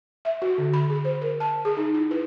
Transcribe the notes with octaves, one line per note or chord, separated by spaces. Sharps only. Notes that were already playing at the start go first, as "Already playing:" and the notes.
E5
F#4
D3
B5
G#4
C5
A#4
A5
G#4
D#4
E4
B4